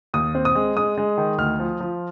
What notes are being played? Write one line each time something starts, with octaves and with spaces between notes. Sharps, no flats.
D#2 D#6
C4
D#6
G#3
G#3 D#6
G#3
D#3
D2 F6
F3
F3